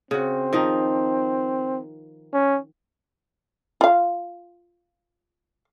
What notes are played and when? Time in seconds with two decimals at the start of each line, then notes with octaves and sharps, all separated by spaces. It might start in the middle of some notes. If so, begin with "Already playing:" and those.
0.11 C#3 C4 F#4
0.53 D#3 F3 D#4
2.33 C#4
3.81 F4 F5